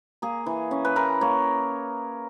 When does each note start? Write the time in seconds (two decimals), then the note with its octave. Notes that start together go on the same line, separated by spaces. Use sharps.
0.22 A#3 G#4
0.46 E3
0.71 C#4
0.85 B4
0.96 E4 A#4
1.21 A#3 C#5